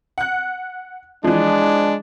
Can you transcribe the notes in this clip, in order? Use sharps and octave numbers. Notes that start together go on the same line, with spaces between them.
F#5 F#6
E3 F3 G#3 D4